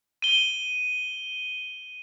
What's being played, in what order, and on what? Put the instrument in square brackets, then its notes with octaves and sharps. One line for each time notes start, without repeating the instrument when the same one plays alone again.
[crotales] D#7 G7